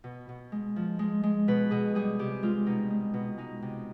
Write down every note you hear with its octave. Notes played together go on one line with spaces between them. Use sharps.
B2
B2
G#3
F3
G#3
G#3
B2 B4
B2 G#4
G3 G#4
C3 G4
G#3 F4
B2 D#4
G#3
B2
G#3 D#4
C3